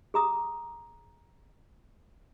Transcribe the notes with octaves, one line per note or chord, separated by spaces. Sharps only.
G#4 A#5 D#6